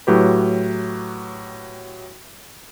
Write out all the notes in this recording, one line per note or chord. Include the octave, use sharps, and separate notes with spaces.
A2 F#3 G4 B4